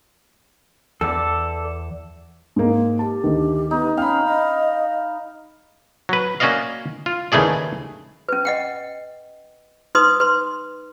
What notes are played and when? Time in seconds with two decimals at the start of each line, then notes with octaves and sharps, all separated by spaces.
1.01 E2 A4 D5
2.56 G#2 A#3
2.99 G4 A5
3.24 D2 D#3
3.71 B3 D#4
3.97 C#4 F5 G5 B5
4.26 D#5
6.09 F#3 B4
6.40 A#3 C#4 F#4 D5 D#5 F5
7.06 F4
7.32 D#2 C#3 E3 A3 G#4 D5
8.29 C#4 B4
8.45 D#5 F#5 G5
9.95 D#4 B4 C6 D#6
10.20 B4 C6